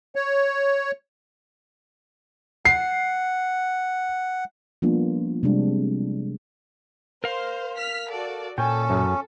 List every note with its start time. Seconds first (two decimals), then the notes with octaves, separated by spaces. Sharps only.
0.15 C#5
2.65 F#5 C7
4.82 F3 G3 A#3 B3 D4 F4
5.43 C3 G3 G#3 C4 D4
7.24 A#4 C5 F5
7.76 F6 B6
8.10 F#4 A4 D5
8.58 A#2 C#4 A4 G5 G#5
8.90 F#2